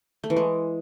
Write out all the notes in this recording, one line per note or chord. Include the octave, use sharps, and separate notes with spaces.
A3
E3
G#3